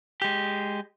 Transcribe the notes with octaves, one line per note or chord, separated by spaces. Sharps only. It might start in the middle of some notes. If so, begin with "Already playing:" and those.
G#3 G4